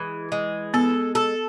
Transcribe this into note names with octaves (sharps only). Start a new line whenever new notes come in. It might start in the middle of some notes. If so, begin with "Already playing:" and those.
Already playing: E3 G#3
G#3
B3 A4
A4